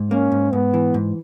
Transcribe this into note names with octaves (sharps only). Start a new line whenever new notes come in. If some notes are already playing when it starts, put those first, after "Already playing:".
Already playing: G#2
A#3 C#4
G#2
G#2 B3
E3
G#2